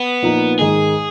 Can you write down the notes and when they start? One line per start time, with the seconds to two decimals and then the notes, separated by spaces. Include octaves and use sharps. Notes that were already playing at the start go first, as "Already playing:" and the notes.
Already playing: B3
0.22 A#2 F3 A#3 D#4
0.59 G#2 D#3 G#3 G#4